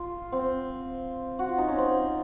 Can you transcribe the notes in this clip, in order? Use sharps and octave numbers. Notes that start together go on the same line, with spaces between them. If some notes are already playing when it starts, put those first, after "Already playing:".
Already playing: F4
C4
F#4
F4
D#4
C#4
C4